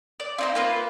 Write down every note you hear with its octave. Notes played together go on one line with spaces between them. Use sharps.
D5
C4 D#4 C5 F5
A#3 F4 B4